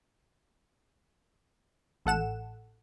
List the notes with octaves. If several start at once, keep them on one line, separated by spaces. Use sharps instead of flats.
A1 A4 F#5 E7